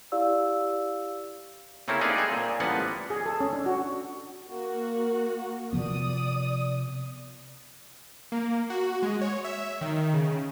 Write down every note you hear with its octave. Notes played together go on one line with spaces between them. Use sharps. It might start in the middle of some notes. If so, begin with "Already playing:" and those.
E4 G4 D5 F5 E6
C#3 A3 A#3 C4 C#4 E4
A#3 D#4 G4 G#4 B4 D5
C4 G#4 A4
A#2
A1 F3 G3 A#3 B3 F#5
G#4
A4
C#4
D4
F#4
A#3 F#4
C3 F3 B3 D5 D#6
A#3
F#4
G#3
C#5
E5
D#3
C#3